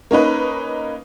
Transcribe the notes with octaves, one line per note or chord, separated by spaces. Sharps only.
A#3 C#4 D#4 B4